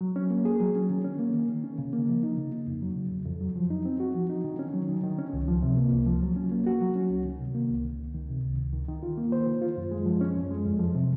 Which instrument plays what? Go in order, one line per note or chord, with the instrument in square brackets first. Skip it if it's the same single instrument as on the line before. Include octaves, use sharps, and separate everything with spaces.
[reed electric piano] F#3
C#4
A#3
G#4
F#3
C#4
D#3
C#4
A#3
D#3
D#3
C#4
C#3
A#3
F3
D#4
C#3
A#3
F2
F#3
C#3
F2
F2
F#3
F3
D#4
C4
F#4
F3
D#4
D#3
C#4
F#3
D#3
D#3
C#4
C#2
F3
C3
A#3
C#2
F3
F#3
C#4
A#3
F#4
F#3
C#4
C#2
D#3
C3
A#3
C#2
D#3
C#2
D#3
C3
C#2
C#2
D#3
D#3
F4
A#3
C5
D#3
F4
F#2
G#3
F3
C#4
F#2
G#3
F2
F3
C3